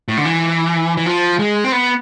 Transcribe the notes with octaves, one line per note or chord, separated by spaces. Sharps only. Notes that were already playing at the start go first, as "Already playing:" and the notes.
A2
D3
E3
E3
F3
G#3
C4
B3